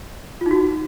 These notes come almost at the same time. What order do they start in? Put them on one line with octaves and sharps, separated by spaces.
F4 D#4 F#4